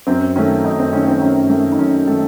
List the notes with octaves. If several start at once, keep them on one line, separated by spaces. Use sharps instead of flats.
F#2 C4
D#3 A3 C#4
F#2 D#4
C4
D#3 A3 C#4
C4
F#2 C#4
D#3 A3
D#4
F#2 C#4
D#3 A3 A4